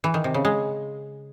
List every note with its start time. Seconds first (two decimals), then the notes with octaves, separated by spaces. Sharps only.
0.04 E3
0.14 D#3
0.24 C3
0.34 C#3
0.45 G#3